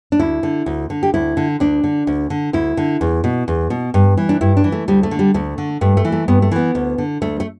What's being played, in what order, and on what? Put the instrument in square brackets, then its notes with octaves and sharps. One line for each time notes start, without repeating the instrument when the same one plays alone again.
[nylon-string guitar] D4
D2 E4
D3
D2
D3
G4
D2 E4
D3
D2 D4
D3
D2
D3
D2 E4
D3
E2
B2
E2
B2
G2
E3
D4
G2 E4
D4
E3
A3
D2 G3
A3
D3
G3
D2 A3
D3
G2 A3
A3
E3
A3
G2 B3
A3
E3 B3
D2
D3
D2 A3
A3